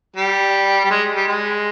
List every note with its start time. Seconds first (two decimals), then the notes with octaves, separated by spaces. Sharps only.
0.16 G3
0.84 G3
0.90 G#3
1.15 G3
1.27 G#3